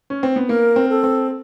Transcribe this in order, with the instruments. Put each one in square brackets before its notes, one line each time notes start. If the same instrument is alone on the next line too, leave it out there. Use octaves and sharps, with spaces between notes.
[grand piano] C#4
C4
B3
[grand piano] A#3 [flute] A#4
[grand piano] C4
[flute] A4
[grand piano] C4